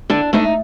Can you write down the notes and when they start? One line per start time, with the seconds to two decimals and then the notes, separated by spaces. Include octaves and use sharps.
0.10 D3 D4
0.33 A3 D4 D#4